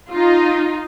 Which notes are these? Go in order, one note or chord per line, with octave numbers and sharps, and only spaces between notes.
D#4 F4